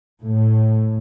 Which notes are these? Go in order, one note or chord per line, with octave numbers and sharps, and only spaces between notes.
A2